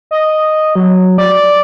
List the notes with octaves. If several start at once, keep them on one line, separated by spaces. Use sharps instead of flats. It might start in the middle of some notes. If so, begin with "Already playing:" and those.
D#5
F#3
D5